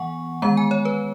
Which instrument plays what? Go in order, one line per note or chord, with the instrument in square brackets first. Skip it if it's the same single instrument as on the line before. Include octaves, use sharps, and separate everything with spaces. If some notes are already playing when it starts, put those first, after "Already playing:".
Already playing: [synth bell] E3 B3 F#5 G#5 C#6
D#3 G#3 B3 A#5
G#5
C#5
B4